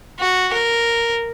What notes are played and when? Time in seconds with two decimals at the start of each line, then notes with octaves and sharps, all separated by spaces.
0.20 F#4
0.53 A#4